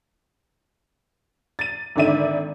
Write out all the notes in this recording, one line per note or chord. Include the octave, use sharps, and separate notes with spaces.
A6 D#7
G#1 D3 D#3 D5 E5 D#7